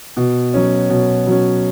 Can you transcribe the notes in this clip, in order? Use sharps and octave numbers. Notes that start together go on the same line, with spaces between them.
B2
F#3 C#4
B2
F#3 C#4